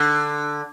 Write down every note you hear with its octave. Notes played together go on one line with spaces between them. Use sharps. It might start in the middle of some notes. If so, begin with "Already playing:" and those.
Already playing: D3